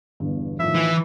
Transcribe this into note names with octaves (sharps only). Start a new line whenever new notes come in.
G1 E2 G2
A2 D#3 F3 E5
E3